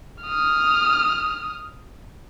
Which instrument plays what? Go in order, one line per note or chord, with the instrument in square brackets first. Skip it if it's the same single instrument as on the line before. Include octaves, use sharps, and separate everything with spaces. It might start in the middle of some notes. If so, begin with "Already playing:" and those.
[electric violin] D#6 F6